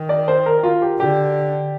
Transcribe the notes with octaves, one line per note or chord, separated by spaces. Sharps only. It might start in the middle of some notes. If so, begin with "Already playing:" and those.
Already playing: D#3
D5
C5
A#4
F4
G4
D3 G4